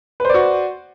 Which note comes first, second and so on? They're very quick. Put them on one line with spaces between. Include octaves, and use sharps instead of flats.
B4 C5 D5 F#4